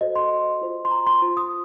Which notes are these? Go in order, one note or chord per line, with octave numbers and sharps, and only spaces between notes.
F#4 A4 C5 D#5
C6
F4 C5
C6
A#5
C6
F4 C5
D#6